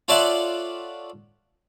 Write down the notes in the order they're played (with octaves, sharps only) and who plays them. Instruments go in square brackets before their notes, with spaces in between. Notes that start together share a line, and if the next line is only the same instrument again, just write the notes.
[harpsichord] F4 A4 C#5 D5 E5 F#5